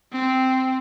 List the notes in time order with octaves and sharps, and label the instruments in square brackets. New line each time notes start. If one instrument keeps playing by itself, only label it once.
[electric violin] C4